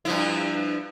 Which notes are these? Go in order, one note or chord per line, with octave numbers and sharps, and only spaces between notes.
G2 F3 E4